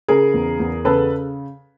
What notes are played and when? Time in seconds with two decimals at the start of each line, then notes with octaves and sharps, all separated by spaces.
0.08 C#3 G#4 A#4
0.34 E2
0.60 E2
0.85 C#3 A4 B4